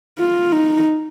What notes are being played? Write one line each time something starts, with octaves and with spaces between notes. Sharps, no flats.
F4
D#4